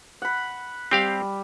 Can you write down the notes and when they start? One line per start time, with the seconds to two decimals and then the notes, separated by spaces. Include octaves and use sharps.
0.22 F#5 B5
0.91 G3 C4 G4 F5